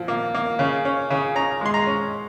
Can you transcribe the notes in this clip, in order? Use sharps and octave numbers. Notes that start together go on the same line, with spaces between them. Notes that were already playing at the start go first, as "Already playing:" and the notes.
Already playing: A#2 F3
A#3
A#3
C#3
C#4
C#3
C#4 A#5
G#3 C6
A#5
C#4